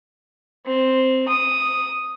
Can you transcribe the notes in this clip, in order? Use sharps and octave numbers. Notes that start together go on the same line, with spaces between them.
C4
D#6